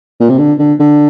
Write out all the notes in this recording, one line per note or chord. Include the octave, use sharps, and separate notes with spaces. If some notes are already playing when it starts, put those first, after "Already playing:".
A#2
C3
D3
D3
D3